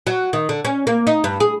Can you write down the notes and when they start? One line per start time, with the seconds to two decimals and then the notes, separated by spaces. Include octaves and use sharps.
0.07 F#3
0.33 D#3
0.49 D3
0.65 C#4
0.87 A#3
1.07 D#4
1.24 G2
1.40 G#4